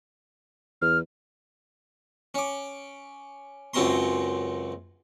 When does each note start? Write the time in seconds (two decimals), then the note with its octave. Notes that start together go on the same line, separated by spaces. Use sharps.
0.82 E2 F6
2.34 C#4 D6
3.74 C#2 F#2 C4 C#4 A#5 C6